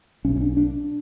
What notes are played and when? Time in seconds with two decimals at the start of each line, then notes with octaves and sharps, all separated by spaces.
0.25 B1 C#4
0.29 B2
0.36 C#4
0.41 D4
0.57 D4